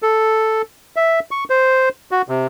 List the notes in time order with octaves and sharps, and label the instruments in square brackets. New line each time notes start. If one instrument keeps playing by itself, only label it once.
[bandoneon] A4
E5
C#6
C5
F#4
C3